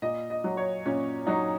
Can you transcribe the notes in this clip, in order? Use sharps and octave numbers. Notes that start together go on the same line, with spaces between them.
A#2 D#5
D#5
F#3
C#5
A#2 C#4
F#3 D#4